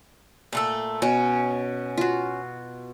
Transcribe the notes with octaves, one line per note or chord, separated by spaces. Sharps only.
A#2 A3 A4
B2 C#4
F4 F#4